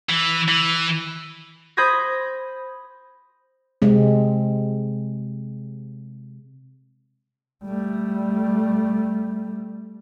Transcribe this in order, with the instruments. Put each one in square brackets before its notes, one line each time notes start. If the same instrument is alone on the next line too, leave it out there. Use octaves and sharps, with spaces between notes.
[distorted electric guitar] E3
E3
[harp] C5 B5 D#6 G6 G#6 A#6
[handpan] C3 G#3 C4
[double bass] G3 A3